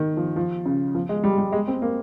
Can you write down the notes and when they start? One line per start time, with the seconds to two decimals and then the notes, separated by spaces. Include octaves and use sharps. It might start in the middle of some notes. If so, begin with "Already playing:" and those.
Already playing: D#3
0.17 F3
0.36 F3
0.66 C#3
0.95 F3
1.09 G#3
1.24 G3
1.38 G3
1.52 G#3
1.68 C4
1.82 A#3